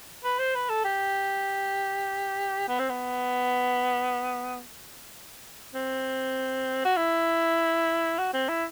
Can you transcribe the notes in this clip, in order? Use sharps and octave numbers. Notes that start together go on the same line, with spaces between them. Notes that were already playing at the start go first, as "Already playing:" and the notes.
B4
C5
B4
A4
G4
B3
C4
B3
C4
F#4
E4
F#4
C4
E4